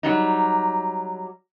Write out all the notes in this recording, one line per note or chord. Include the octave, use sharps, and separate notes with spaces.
F#3 G3 D#4